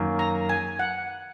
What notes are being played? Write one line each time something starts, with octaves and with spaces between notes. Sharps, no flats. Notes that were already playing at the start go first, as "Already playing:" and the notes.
Already playing: F#2 D#3 A#3
A#5
G#5
F#5